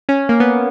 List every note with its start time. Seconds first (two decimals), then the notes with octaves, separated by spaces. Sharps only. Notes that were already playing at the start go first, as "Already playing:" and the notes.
0.09 C#4
0.29 A#3
0.40 B3